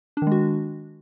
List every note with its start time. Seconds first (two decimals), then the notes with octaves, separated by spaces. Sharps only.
0.17 D4
0.22 D#3
0.27 G#3
0.32 F#4